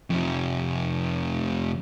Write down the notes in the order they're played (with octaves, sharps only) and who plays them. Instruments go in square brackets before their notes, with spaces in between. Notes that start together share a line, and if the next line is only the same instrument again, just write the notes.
[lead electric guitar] F2 C3